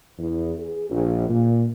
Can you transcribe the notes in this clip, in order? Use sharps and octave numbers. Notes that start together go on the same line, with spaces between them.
E2
G#4
A#1
A#2